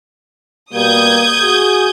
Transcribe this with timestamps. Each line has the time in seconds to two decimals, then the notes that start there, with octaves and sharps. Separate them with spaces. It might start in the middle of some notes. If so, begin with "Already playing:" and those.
0.73 B2 G3 A#3 D#6 G6 G#6
1.41 F#4 G#4